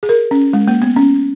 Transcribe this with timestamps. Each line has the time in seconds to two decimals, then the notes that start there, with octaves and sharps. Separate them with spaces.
0.03 G#4
0.09 A#4
0.31 C#4
0.53 G#3
0.68 A#3
0.82 B3
0.97 C#4